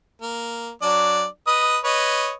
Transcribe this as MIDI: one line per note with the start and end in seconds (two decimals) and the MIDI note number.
0.22 0.70 58
0.82 1.26 54
0.82 1.26 62
0.82 1.26 74
1.47 1.78 71
1.47 1.78 75
1.47 1.78 87
1.84 2.32 71
1.84 2.32 73
1.84 2.32 75